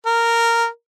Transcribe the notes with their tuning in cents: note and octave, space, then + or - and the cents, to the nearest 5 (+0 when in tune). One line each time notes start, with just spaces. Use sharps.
A#4 -10